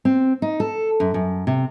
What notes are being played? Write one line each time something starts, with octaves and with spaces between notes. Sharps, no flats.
C4
D#4
A4
F#2
F#2
C3